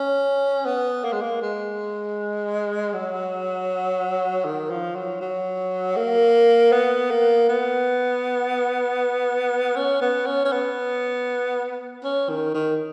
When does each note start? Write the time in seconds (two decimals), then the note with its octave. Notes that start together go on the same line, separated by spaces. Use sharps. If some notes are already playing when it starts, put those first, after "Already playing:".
Already playing: C#4
0.65 B3
1.04 A#3
1.12 G#3
1.21 A#3
1.42 G#3
2.93 F#3
4.45 D#3
4.70 F3
4.95 F#3
5.21 F#3
5.96 A#3
6.72 B3
7.11 A#3
7.49 B3
9.75 C#4
10.01 B3
10.26 C#4
10.45 C#4
10.52 B3
12.03 C#4
12.29 D#3
12.54 D#3